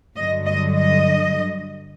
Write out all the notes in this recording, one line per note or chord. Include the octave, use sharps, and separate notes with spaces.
G2 D3 F#3 D#5
D#5
D#5